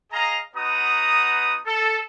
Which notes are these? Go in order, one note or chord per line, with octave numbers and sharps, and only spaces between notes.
G#4 D#5 F5 A#5
B3 D#4 F#4 B4 A#5 D#6
A4